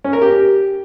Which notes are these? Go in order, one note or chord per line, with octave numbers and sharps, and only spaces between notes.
C#4
A#4
G4